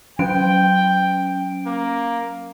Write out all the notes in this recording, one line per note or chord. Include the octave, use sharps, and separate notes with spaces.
F#3 C#4 G5 D7
A#3